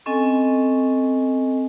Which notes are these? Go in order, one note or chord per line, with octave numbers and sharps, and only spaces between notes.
C4 C#4 A4 D#5 G#5